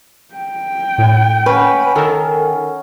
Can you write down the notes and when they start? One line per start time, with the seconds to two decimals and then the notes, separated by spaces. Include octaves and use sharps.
0.34 G5
0.98 A2
1.46 C#4 B4 F#5
1.96 D#3 A4 A#4